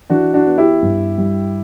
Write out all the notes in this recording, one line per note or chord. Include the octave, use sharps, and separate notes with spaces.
E3 D4 F#4
D4 F#4
B3
E4 G4
G2
G3